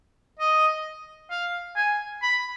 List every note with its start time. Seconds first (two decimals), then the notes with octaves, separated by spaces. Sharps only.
0.39 D#5
1.31 F5
1.76 G#5
2.22 B5